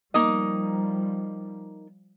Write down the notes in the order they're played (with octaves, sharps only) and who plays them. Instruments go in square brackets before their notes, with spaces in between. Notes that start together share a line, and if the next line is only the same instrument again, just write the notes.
[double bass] F3 G3 [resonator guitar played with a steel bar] A#3 D#4 D#5